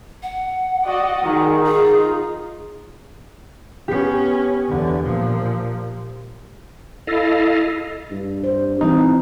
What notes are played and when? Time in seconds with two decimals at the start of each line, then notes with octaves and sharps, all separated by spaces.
0.23 F#5
0.86 F#4 D5 D#5
1.24 D#3 G#4
1.64 D#4 F4 G#4
3.88 B3 C#4 G4
4.68 E2 D3
5.04 A#2 F3
7.07 E4 A4 D#5 F5
8.11 G2
8.44 C5
8.81 E3 G3 C4 D#4